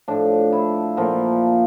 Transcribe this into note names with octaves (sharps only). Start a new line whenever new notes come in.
A2 F3 D4
E4
A#2 F3